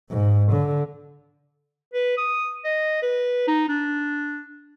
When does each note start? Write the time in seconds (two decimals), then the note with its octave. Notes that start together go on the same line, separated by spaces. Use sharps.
0.10 G#2
0.52 D3
1.93 B4
2.17 D#6
2.65 D#5
3.02 B4
3.48 D#4
3.68 D4